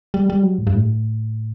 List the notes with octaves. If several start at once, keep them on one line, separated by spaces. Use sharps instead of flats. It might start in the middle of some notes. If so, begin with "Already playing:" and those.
G3
G3
F#3
A2
G2
A2